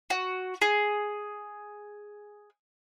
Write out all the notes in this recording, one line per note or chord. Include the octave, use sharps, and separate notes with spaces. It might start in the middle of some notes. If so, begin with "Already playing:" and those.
F#4
G#4